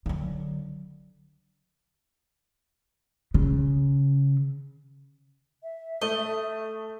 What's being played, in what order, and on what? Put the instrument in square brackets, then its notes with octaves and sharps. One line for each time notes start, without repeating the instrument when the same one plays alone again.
[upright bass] D3 F#3
C#3
[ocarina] E5
[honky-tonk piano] A3 [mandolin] D#5